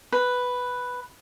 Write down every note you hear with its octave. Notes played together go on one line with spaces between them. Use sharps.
B4